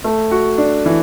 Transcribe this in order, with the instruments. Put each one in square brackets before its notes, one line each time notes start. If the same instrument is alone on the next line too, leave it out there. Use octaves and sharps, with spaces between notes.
[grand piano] A3
F#4
D4
E3